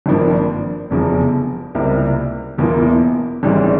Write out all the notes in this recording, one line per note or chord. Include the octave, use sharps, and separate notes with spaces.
G#1 G2 F3 A#3
F1 E2 C#3 F3
C#2 C3 G3 A#3 E4
E1 E2 E3 A#3 F4
G#1 G#2 E3 G3 C#4